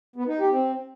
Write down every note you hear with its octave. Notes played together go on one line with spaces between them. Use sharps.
B3
D#4
G4
C4